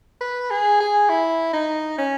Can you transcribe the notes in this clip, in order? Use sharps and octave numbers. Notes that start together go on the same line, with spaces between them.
B4
G#4
G#4
E4
D#4
C#4